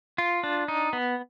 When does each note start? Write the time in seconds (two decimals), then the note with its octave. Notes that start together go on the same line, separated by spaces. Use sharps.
0.18 F4
0.43 D4
0.68 D#4
0.93 B3